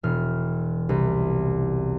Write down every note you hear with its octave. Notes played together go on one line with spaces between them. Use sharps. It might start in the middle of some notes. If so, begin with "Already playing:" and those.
E1 F6
C2